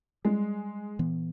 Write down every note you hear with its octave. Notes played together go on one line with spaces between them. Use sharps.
G3 G#3
A#2 E3 B3